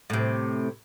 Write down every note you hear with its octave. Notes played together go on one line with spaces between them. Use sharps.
A2 C3